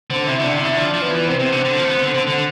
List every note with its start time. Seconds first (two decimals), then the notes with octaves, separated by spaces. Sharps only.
0.10 D3 C4
0.27 C3 E4
0.39 D3 D4
0.52 C3
0.60 D3 E4
0.77 F3 D4
0.94 F3
1.02 B3
1.11 E3
1.27 C3 C4
1.39 C3
1.52 D3
1.65 D3
1.77 F3
1.84 A3
1.90 B3
2.02 D3
2.15 D3
2.27 D3